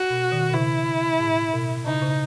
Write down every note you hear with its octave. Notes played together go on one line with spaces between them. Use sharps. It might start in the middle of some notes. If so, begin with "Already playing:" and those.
Already playing: F#4
B2
B2 D#3
B2
C#3 E4
A2
B2
C#3 D#4
C#3